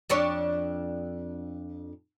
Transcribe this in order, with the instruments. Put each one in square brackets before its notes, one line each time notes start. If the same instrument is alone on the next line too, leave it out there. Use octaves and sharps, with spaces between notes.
[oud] F2 D4 C#5